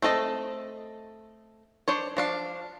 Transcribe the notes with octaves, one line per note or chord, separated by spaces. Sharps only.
A3 C4 A4 D#5
D4 C5 C#5
F3 D4 F5